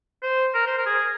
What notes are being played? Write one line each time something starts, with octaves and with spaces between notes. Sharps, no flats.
C5
A#4
C5
A#4
G#4